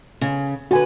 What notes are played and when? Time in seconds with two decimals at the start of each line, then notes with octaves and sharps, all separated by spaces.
0.21 C#3
0.71 D3 F#4 B4 G#5